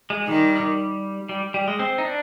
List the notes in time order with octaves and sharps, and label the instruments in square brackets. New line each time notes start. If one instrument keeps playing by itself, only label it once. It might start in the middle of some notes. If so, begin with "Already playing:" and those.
[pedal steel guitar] G#3
[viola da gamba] D#3 [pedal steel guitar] G3
[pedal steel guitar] G3
G3
G#3
C4
D#4
D4